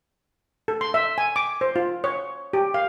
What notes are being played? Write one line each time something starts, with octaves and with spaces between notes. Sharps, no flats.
A4
C6
E5
G#5
D6
C5
F4
C#5
G4
F5